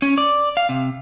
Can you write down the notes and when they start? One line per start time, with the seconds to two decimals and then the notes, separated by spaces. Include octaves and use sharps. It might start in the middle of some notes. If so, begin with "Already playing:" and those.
0.02 C#4
0.18 D5
0.57 F5
0.69 C3